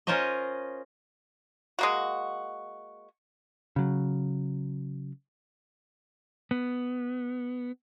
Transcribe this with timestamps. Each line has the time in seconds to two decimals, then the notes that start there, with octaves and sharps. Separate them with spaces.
0.07 C#4 F4 A#4 C5 C#5 D#5
1.79 G#3 A#3 F#4
3.76 C#3 F#3
6.51 B3